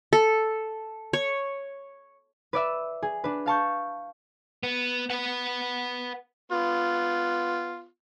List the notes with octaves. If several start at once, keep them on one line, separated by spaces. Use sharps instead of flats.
A4
C#5
B4 D5 E5
G#4
D4 B4
F5 A5 C#6 G6
B3
B4 F#5
B3 F4